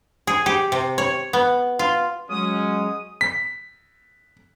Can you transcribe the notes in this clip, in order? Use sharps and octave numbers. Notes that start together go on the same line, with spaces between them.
G#4
G4
C3
C#5
B3
F4
F#3 G#3 C#4 D#6
B6